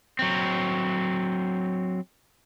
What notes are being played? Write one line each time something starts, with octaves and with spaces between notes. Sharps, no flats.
F#3 C4